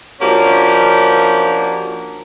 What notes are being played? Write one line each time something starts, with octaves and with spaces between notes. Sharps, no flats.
F3 A#3 C#4 D4 F#4 G4